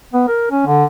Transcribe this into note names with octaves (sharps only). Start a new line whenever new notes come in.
B3
A#4
C#4
D3